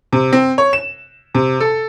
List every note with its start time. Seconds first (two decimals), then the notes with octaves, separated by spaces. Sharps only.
0.13 C3
0.33 C4
0.58 C#5
0.73 E7
1.35 C3
1.60 A4